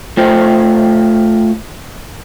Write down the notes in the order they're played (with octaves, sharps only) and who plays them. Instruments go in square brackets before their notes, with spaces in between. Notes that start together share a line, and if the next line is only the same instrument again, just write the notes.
[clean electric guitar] A3 F4 C5 G5